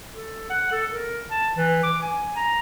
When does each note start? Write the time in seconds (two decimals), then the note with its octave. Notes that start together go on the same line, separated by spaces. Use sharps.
0.12 A4
0.50 F#5
0.72 A4
0.91 A#4
1.31 A5
1.57 E3
1.84 D6
2.02 G#5
2.36 A#5